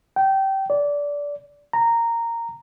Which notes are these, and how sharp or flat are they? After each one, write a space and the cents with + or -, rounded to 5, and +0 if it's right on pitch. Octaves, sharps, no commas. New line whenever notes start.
G5 -20
D5 -20
A#5 -10